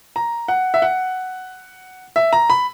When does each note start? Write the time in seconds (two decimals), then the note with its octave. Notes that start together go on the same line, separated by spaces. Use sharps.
0.16 A#5
0.48 F#5
0.74 E5
0.82 F#5
2.16 E5
2.33 A#5
2.50 B5